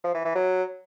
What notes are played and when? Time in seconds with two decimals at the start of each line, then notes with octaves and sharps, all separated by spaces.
0.04 F3
0.14 E3
0.25 E3
0.35 F#3